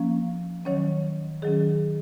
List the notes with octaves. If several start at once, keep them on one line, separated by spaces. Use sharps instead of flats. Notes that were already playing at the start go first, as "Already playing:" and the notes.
Already playing: F3 A#3 C#4
D#3 F#3 C#4 C#5
D#3 F#3 C#4 G#4